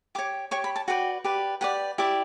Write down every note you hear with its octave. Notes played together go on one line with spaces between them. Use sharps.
G4 C#5 D6
G4 C#5 C#6
B5
A5
F#4 B4 D5 G5
G4 B4 D5
G4 B4 D5 F#5
E4 G4 D5 E5